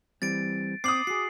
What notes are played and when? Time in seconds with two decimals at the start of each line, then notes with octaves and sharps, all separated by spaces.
0.22 E3 G3 C4 A6 D7
0.84 C4 D6 D#6 C7 F#7
1.07 F#4 G#4 C7